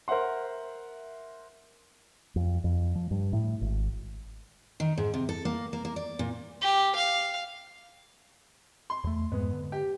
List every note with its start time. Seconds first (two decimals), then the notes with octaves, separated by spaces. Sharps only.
0.08 A#4 C5 E5 F#5 C6
2.36 F2
2.64 F2
2.95 F3
3.11 G2
3.33 A2
3.61 G#1
4.80 D#3
4.98 G#2
5.14 C3
5.29 A4
5.45 A#3
5.73 A#3
5.85 A#3
5.96 D5
6.19 A#2
6.62 G4
6.95 F5
8.90 C6
9.04 E2 A3
9.32 F2 G#2 G#3 B3
9.52 D3
9.72 G4